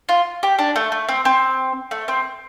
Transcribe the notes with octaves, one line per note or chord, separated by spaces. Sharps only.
F4
G4
D4
A3
A3
C4
C4
A3
C4